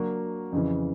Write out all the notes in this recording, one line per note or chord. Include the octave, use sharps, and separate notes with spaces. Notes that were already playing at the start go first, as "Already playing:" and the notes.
Already playing: F#3 A#3 D4 F#4 A#4
F2 C#3 E3